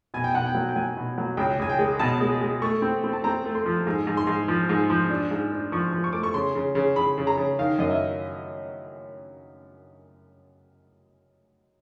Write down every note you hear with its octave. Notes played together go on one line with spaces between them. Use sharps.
B2 G#5
G5
B2 F#5
G5
F#3
G5
F#3 G#5
B2
F#3
C#2 G5
C#2 G#5
G5
G#3
B2 A5
G#3
G#3
A3 C#6
C4
C4
A5
C4 A#5
A3
C6
F3
G#2
G#2
C6
G#2
F3
G#2
F3
D4
G#2
D4
F3 C#6
F3
C#6
A3 D6
C#6
C#3 C6
C#3
C#3
C#3 B5
C#3
A#5
C#3
D#3 F5
F#2 D#5
E5